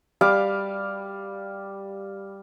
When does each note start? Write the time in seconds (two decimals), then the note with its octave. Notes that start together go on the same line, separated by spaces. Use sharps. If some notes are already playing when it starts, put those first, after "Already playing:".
0.21 G3 F5 D6